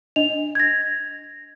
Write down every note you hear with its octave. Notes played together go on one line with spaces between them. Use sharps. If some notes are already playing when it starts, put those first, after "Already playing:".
D4 D#5 F7
G#6 A#6